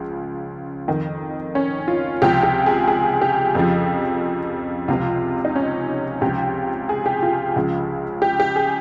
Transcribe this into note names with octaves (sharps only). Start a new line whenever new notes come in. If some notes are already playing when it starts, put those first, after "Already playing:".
Already playing: C#2 C#3 F3
F2 D#3
C#4
F4
C#2 C3 F3 G4
G4
G#4
G#4
G4
F2 C#3 F3
C#2 C3 F3 F4
D#4
C#4
C#2 C3 F3 G4
G#4
G4
F4
C#2 C#3 F3
G4
G4
G#4